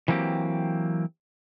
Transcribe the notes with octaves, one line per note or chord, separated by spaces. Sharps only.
E3 F#3 A#3 C4 G4